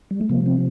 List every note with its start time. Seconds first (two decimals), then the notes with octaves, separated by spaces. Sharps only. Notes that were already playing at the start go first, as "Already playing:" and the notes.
0.11 G3
0.21 A3
0.29 C3 F3 A#3
0.46 C4